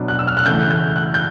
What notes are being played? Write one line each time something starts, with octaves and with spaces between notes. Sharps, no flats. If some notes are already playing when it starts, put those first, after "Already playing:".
Already playing: B2 F#3 B3 D4
F#6
E6
F6
F#6
C#3 E3 A3 G6
G6
F#6
G6